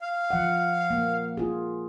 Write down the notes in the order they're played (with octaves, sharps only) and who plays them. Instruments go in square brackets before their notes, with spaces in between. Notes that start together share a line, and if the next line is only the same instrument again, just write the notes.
[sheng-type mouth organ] F5
[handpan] F3 F#5
A#3
F4 G#4